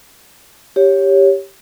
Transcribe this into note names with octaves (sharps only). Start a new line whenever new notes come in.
G4 C#5